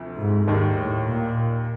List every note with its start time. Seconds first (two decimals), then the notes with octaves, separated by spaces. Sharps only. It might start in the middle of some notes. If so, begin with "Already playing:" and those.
Already playing: D2 C3 F3
0.19 G#2
0.47 D#2 G#2 D#3 G3
0.76 A2
1.05 A#2